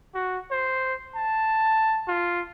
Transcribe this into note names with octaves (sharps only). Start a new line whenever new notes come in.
F#4
C5
A5
F4